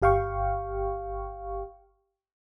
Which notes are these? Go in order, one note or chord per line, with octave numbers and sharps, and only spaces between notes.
G1 G4 F5 G5 C#6